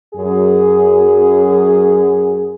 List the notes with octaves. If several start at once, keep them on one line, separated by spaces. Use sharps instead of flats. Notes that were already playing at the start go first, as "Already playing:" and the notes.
F#2 G#4